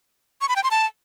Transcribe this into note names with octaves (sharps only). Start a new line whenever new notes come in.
C#6
B5
G5
C6
A5